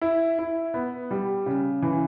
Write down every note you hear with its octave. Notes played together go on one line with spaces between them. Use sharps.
E4
E4
B3
G3
C#3
E3